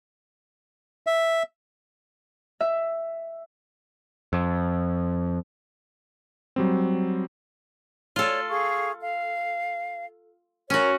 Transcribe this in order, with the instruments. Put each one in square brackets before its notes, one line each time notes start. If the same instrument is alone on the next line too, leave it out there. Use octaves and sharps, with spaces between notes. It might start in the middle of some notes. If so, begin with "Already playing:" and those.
[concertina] E5
[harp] E5
[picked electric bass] F2
[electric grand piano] F#3 G3 C4
[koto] F4 A4 [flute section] C#5 D5
[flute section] G#4 F5 C#6
F5
[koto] C#4 F#4 [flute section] A#4 C#5